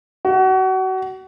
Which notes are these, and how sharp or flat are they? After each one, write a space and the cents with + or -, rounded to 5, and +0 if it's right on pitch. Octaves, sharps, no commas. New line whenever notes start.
F#4 +30